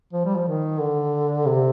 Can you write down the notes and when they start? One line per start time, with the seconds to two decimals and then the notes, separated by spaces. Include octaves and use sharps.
0.13 F3
0.25 G3
0.36 F3
0.47 D#3
0.81 D3
1.47 C3